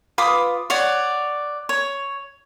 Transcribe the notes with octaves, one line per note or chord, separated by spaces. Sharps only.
F4 B4 D6 D#6
C#5 D5 F#5
C#5